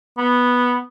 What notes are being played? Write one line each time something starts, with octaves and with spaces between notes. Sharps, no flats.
B3